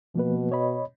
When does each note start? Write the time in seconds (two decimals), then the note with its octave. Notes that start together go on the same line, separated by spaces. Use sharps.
0.15 B2 F3 A#3 B4
0.52 C#5 D#5 B5